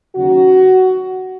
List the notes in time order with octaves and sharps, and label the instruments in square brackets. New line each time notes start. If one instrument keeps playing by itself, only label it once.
[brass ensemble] D#2 C#3 F#3 F#4